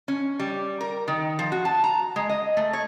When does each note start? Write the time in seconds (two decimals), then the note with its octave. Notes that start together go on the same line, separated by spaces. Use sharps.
0.08 C#4
0.40 G3
0.81 A#4
1.08 D#3
1.39 F3
1.52 F#4
1.65 A5
1.84 A#5
2.16 G#3
2.29 D#5
2.57 A3
2.73 C#5